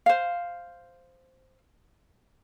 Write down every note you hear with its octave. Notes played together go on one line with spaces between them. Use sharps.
C5 F5